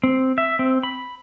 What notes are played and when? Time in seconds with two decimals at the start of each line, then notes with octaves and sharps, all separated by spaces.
0.04 C4
0.38 E5
0.59 C4
0.83 B5